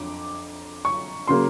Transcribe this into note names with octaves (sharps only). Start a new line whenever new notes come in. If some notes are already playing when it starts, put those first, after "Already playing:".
Already playing: F2 D3 F3 D6
C#6
C#3 F#3 A#3 C6